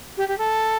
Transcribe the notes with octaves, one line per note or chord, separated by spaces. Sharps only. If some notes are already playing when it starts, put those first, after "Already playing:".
G4
G4
A4